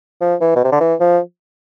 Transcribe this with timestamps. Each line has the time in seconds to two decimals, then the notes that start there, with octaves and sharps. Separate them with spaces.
0.21 F3
0.41 E3
0.56 B2
0.64 C3
0.72 D3
0.81 E3
1.00 F3